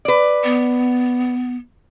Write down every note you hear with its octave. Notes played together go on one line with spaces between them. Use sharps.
B4 D5
B3